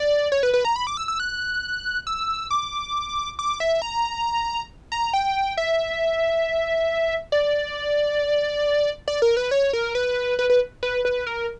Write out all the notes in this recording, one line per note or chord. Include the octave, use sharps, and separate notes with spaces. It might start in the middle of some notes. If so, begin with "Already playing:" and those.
Already playing: D5
C#5
B4
B4
A#5
B5
D6
E6
E6
F#6
E6
D6
D6
E5
A#5
A#5
G5
E5
D5
D5
A#4
B4
C#5
A#4
B4
B4
B4
B4
B4
A#4